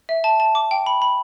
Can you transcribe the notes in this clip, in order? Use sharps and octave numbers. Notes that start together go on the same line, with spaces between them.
E5
A5
A5
D6
G5
B5
B5